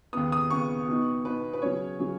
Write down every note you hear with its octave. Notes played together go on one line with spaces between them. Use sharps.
D#2 C#3 B3 D#6
D#6
D#2 C#3 B3 C#6
B2 B3 D#4
B2 B3 D#4 B4
B4
C#3 F#3 C#4 C#5
C#3 F#3 C#4